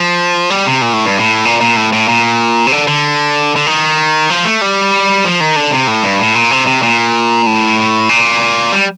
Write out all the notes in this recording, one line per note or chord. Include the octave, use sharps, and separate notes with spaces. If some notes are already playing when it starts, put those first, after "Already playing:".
Already playing: F3
G3
C3
A#2
A2
G2
A2
A#2
A#2
A2
A2
A#2
C3
D3
D3
D3
D#3
F3
A3
G3
F3
D#3
D3
C3
A2
G2
A2
A#2
C3
C3
A#2
A2
A#2
G3